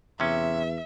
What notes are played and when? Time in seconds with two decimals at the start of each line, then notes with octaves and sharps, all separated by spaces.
0.20 E2 C3 C#4 E5